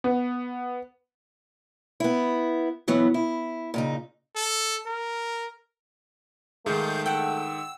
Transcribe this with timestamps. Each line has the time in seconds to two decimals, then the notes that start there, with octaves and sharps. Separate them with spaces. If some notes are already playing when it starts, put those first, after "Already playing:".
0.04 B3
2.00 B3 E4
2.88 B2 E3 F#3 B3
3.14 E4
3.74 A#2 C#3 D#4
4.36 A4
4.87 A#4
6.66 G#2 D#3 A3 G#4 F5 G6
7.06 F#5 G5 E6